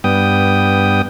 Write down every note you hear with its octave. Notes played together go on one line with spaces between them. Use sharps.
G2 B3 G5 D#6